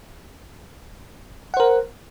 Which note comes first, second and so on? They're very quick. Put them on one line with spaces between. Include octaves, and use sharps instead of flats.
F#5 C5 A#4